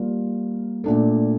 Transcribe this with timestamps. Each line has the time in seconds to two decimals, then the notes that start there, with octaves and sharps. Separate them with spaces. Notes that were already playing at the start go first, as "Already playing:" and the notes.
Already playing: G3 A#3 F4
0.84 A#2 A3 D4 A4